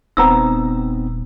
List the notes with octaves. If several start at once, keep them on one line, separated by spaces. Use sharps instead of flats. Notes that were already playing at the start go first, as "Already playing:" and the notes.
D#1 B3 C4 D#4 A#5 D#6 E6